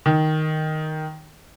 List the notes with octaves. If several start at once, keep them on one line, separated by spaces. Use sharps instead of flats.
D#3